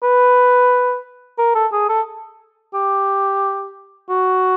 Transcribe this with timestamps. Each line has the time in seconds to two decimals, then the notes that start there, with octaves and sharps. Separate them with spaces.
0.03 B4
1.38 A#4
1.55 A4
1.73 G#4
1.89 A4
2.74 G4
4.09 F#4